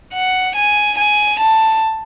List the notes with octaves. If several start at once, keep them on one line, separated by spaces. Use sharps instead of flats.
F#5
G#5
G#5
A5